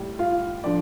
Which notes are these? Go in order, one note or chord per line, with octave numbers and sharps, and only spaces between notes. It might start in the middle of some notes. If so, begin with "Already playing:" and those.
Already playing: A2 G3
F4
D3 F3 D5